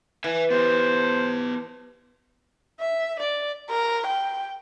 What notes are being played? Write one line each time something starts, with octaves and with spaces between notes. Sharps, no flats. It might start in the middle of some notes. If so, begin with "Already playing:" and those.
E3 E5 G#5
B3 G4 C5
E5
D5
A#4
G5